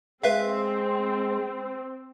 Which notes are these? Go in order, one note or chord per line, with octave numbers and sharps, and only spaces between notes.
G#3 C4 B4 E5 F5